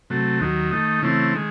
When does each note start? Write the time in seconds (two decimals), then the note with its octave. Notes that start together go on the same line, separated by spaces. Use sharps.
0.10 C3 F#3 A3
0.41 D#2 D#3 F#3
0.71 D#3 A3 D#4
1.02 C#3 E3 A3 C4
1.35 D#3 G#3